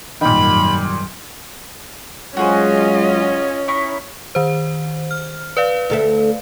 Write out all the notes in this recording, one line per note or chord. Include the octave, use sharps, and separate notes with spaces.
G#1 F#2 A#2 D#3 G3 B5
F#3 G#3 C#4 F4 F#4 G#4 C5 D#5
D#4 E4 C#6
D#3 C5
F6
B4 D5 F5
D2 A4 E5